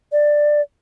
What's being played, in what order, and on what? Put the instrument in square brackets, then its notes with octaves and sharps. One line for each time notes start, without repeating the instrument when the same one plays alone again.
[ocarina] D5